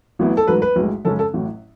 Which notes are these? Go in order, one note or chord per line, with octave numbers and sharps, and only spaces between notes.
A1 A2 F#3 B3 E4
A4
A1 G#2 F#3 B4
B4
B1 A2 G#3
F#2 C#3 G#3 C#4 A4
A4
A1 A2 F#3